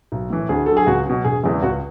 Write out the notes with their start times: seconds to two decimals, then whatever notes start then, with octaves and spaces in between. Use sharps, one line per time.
0.12 B1
0.30 A2 E3
0.49 D2 G#4
0.66 D3 F#3 A4
0.77 G#4
0.87 C#2 F#4
1.06 B2 F#3
1.24 E1 G#4
1.43 E2 C#3 E3 G#3
1.62 C#2 F#4